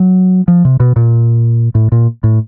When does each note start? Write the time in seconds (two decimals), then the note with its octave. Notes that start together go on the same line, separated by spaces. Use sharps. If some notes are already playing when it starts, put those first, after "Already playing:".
Already playing: F#3
0.48 F3
0.65 C3
0.80 B2
0.96 A#2
1.75 A2
1.92 A#2
2.24 A2